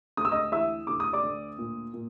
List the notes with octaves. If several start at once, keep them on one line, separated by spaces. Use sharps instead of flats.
D2 D#6
E6
D#5 D#6
E3 E5 E6
D2 D6
D#6
D5 D6
D2
A#2
A#2